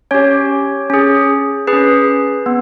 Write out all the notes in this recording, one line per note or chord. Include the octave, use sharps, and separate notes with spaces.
C#4 G4 C#5
C#4 G#4
G#4 B4
C#4
B3